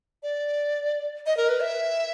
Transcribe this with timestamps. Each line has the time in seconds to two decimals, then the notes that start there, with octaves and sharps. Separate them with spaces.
0.23 D5
1.26 D#5
1.37 A#4
1.49 B4
1.60 E5